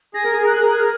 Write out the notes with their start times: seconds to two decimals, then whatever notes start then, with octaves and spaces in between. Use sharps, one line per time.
0.14 G#4 A#6
0.24 A#4
0.33 G#4
0.42 A#4 F#6
0.52 G#4
0.61 A#4
0.71 G#4
0.79 A#4 F6